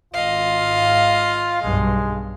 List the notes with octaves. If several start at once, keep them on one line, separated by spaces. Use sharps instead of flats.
G#1 F4 D#5 F5
B1 G2 G#3